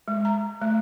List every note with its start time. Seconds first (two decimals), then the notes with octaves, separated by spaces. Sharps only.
0.08 G#3
0.25 A#5
0.62 A3